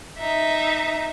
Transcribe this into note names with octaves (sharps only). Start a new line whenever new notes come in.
D#4 E5